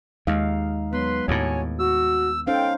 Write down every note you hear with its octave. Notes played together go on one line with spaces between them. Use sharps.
D#2 G#3 D#4 F5
F#3 B3 B4 C6
D#2 A2 F#4 C#5 G#5
F#4 E6
C#4 D#4 A4 C5 F5 G5